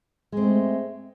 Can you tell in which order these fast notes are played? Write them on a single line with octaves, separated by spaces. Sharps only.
G#3 C4 A3